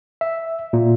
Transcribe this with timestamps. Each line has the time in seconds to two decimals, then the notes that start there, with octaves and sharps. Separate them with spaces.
0.21 E5
0.73 A#2